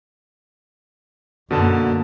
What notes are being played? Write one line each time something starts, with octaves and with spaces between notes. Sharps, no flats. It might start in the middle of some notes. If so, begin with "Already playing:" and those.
F#2 B2 D3 A#3 A5